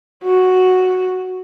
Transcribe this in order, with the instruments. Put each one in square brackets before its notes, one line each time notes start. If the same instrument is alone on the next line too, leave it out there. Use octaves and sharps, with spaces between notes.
[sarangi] F#4